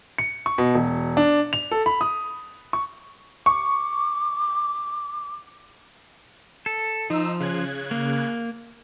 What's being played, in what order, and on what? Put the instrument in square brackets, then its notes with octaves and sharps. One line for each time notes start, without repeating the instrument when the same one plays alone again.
[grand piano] C#7
C#6
B2
E1
D4
F7
A4
B5
D#6
C#6
[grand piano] C#6 [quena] D6
[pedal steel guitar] A4
[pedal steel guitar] F3 [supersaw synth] D#4 E6
[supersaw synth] C#3 F#6 G#6
[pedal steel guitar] A#3